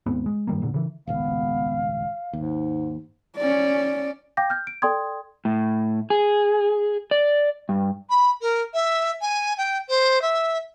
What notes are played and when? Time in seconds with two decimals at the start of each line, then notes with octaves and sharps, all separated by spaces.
0.06 D#2 G#2 B3 C4
0.26 G#3
0.47 G2 D#3 G3 A#3
0.62 E1 A#2 D3
0.74 C#3 E3
1.07 D#1 G#1 C#2 B3 F5
2.33 D#2 G#2
3.37 C#4 D5
4.37 F5 G5 D6 G6 A#6
4.50 F6 G6
4.67 D7
4.82 A4 D5 G5 C6 D#6 G#6
5.45 A2
6.10 G#4
7.11 D5
7.69 G2
8.10 B5
8.41 A#4
8.73 E5
9.21 G#5
9.57 G5
9.89 C5
10.21 E5